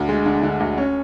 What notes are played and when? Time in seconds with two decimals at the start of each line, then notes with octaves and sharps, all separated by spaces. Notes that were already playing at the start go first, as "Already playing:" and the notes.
Already playing: D2 D3
0.09 G#3
0.26 D3
0.43 D3
0.60 D2
0.78 C#4